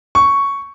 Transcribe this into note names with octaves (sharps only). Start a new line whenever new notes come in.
C#6